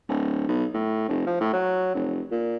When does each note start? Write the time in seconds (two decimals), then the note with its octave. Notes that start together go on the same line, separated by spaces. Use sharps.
0.09 D1
0.48 B1
0.74 A2
1.08 F1
1.26 F3
1.41 A2
1.53 F#3
1.95 F1
2.31 A#2